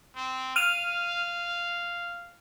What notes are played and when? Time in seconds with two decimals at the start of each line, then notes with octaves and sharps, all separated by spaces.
0.15 C4
0.56 F5 F6 D#7 F7